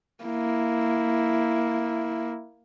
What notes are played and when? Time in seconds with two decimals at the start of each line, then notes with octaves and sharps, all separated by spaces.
0.25 A#3 E4